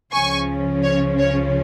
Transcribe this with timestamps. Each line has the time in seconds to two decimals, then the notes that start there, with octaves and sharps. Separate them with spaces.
0.12 C#2 C#3 F3 C#4 G#5 C#6
0.83 C#5
1.19 C#5